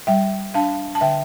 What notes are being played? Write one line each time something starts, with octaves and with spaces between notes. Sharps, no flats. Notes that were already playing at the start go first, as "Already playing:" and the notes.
G3 E5 G5
D4 F5 A5
A5
D3 E5 G5